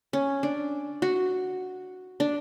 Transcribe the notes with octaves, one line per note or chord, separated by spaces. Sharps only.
C#4
D4
F#4
D4